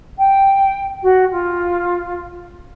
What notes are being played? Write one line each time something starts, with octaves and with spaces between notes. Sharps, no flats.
G5
F#4
F4